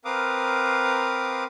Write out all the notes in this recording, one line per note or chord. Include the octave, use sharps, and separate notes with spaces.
C4 A#4 B4 F5 D6 D#6